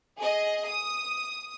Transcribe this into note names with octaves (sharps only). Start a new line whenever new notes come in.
G#4 D#5
D#6